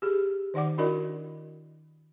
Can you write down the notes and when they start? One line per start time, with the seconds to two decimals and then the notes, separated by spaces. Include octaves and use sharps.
0.02 G4 G#4
0.54 D#3 D#4 D5 F#5 D6
0.78 D4 E4 F#4 A#4 D5 D#5